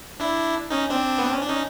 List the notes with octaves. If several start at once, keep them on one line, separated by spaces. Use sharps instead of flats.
D4 E4
C#4 D#4
C4 D4
B3
C4
C#4
D4
C#4 D#4